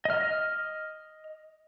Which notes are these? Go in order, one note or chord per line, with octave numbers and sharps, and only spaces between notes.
D#5 F6